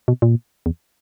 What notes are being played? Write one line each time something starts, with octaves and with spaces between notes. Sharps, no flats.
B2
A#2
E2